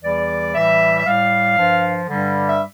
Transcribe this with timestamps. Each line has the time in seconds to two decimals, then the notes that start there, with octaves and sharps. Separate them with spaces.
0.01 E2 E3 G3 D5
0.53 A2 E3 G3 E5
0.97 E5
1.05 A2 G3 F5
1.57 G2 F3
2.08 G2 D3 G3
2.49 E5